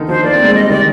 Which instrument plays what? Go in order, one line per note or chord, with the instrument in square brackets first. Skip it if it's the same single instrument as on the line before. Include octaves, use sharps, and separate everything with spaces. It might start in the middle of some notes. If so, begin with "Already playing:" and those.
Already playing: [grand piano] D3 D#3
[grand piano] F3 [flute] C5
[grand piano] A#3 [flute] D5
[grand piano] C4
G#3
[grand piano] G3 [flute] D#5
[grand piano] D#3 [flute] D5